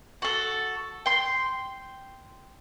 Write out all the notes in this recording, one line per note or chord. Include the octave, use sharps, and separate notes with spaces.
F#4 A4
G5 C6